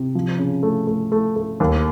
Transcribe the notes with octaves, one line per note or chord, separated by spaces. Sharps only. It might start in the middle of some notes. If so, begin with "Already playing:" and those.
Already playing: C3
F3
C#3
A3
A3
A3
A3
D#2